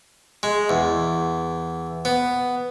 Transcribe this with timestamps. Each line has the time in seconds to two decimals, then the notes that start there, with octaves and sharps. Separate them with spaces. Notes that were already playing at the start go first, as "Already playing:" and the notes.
0.43 G#3
0.69 E2
2.05 B3